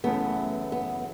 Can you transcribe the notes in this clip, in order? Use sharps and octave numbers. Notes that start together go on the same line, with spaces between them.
F#2 C#3 E3 A3 B3 C#4
B3